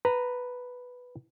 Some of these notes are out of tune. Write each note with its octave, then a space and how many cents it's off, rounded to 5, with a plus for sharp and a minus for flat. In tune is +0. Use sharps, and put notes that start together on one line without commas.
B4 +0 A#5 -5